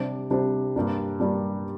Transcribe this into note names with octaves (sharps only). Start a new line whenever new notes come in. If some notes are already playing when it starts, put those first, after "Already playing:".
Already playing: C3 G3 D4 G4 C5
C3 G3 D4 G4 C5
G2 G3 A#3 D4
G2 G3 A#3 D4